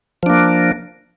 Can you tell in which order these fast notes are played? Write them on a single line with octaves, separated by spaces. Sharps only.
F3 D4 A#3